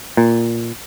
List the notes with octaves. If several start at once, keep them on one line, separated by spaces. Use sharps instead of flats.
A#2